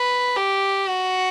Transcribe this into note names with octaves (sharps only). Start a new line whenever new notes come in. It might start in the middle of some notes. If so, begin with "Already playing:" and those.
Already playing: B4
G4
F#4